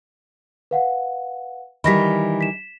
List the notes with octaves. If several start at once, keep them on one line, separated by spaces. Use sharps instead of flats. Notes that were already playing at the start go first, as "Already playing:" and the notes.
B4 F5 F#5
D#3 E3 G3 B5 A#6 B6
B6 E7